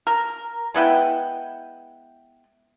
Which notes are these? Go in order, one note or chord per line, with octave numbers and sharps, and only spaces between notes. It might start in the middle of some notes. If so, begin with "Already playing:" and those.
A#4
G#3 B3 E4 G5